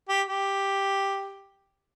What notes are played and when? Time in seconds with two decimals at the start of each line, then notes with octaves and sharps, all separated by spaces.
0.09 G4
0.28 G4